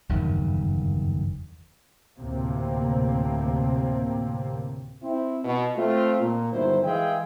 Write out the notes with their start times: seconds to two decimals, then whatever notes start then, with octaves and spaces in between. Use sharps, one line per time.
0.09 F#1 E2 G2 D#3
2.17 D2 A2 C3 A#3 C4
5.03 C4 E4
5.44 B2
5.76 A3 C4 F4
6.20 A#2
6.53 G1 D#3 F#3 E4 C5
6.83 E3 G#3 G#4 E5 F5 G5